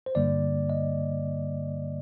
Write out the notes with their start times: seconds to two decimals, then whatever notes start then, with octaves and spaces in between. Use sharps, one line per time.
0.06 C5
0.15 G2 D3 G3 A#3 D5
0.70 D#5